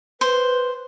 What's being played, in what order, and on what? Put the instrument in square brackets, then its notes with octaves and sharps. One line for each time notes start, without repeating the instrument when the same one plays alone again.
[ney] B4 [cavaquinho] C5